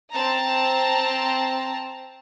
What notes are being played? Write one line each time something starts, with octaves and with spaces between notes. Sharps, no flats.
C4 A5 A#5